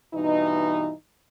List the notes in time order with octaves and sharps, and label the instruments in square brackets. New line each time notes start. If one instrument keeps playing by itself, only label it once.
[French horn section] G2 B2 E3 D#4